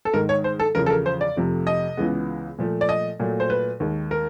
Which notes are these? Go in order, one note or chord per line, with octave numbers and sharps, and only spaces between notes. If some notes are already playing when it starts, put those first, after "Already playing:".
A4
G#2 D#3 G#3 A#4
C#5
C5
A4
E2 C#3 F3 A#4
A4
A#4
C5
D5
F2 C3 F3 A3
D#5
C#2 C#3 E3 G#3 B3
A#2 F3 A3
D5
D#5
A#2 F#3 A3
C5
B4
D#2 D#3 G#3
A#4